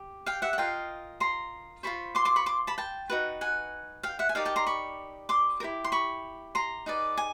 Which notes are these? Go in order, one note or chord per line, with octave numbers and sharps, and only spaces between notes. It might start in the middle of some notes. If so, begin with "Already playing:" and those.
Already playing: G4
F5 G5
E5 F#5
F#5
F4 A#4 D#5 F5 G5
A#5 C6
F4 A4 C5 B5 C#6
C6 D6
C6 D6
B5 C#6
C6 D6
A5 B5
G5 A5
D#4 F#4 B4
F#5 G#5
F5 G5
E5 F#5
G#5
D#4 G4 A#4 D5 F5 G5
G5 A5
A#5 C6
B5 C#6
C6 D6
E4 G4 A#4
C6
B5 C#6
A#5 C6
D#4 G#4 B4 D5
G#5